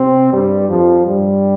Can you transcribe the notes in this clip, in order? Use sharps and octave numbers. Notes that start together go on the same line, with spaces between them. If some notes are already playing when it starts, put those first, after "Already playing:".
Already playing: C3 C4
G2 G3
F2 F3
G2 G3